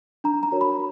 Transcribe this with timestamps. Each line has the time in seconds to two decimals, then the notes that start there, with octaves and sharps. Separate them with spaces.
0.24 D4 A#5
0.43 A#5
0.52 F#4 A#4 C#5
0.61 B5